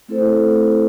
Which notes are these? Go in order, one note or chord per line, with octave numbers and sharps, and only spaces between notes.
A3 C4 E4 A4 C5